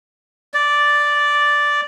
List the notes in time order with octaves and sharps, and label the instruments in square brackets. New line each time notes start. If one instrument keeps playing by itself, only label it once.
[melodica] D5